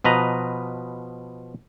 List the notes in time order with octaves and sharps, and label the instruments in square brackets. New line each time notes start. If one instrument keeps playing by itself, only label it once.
[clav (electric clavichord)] B2 F3 B4 D#5 A#5